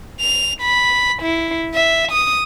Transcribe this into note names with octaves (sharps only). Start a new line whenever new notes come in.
F7
B5
E4
E5
D#6